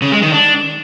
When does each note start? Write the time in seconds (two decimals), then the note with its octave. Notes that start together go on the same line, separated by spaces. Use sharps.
0.02 C#3
0.12 G#3
0.22 D#3
0.32 D4